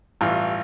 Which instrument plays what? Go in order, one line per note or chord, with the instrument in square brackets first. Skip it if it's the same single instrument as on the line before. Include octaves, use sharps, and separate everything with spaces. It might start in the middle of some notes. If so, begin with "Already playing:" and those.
[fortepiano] A1 G2 E3 F4